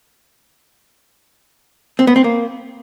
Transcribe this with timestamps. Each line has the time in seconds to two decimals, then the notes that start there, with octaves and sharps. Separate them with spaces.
1.99 C4
2.07 B3
2.16 C4
2.24 A#3